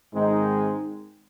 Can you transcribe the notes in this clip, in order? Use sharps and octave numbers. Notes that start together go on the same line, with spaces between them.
G#2 D#3 G#3 C4 D#4